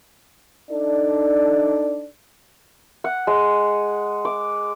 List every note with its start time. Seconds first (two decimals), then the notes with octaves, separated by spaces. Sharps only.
0.71 D4 D#4 A4 D5
3.04 F#5
3.27 G#3
4.25 D6